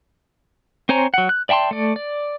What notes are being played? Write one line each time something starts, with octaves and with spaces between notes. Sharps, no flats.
C4 C5 C#5 G#5 A#5
F#3 F#5
F#6
D5 E5 G5 A5 C6
A3 D5
D5